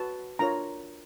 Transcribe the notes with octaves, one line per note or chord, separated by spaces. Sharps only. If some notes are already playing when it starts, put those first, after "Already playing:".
Already playing: F#4 B4 A5
D4 F4 A#4 C#5 A#5